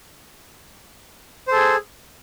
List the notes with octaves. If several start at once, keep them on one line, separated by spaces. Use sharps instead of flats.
G#4 A4 C5